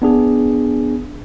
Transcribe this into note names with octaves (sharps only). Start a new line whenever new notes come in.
B3 D4 G#4